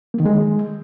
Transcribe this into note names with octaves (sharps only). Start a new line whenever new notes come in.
A#3
D#3
G#3